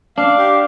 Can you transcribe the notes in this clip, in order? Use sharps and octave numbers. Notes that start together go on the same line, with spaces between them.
D4 F5
G4